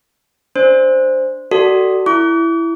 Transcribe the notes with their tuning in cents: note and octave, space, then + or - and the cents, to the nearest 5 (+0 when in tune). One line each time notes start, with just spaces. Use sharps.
D4 +0 C5 +0
F#4 +30 A4 +20 D5 +0
E4 +10 D6 -45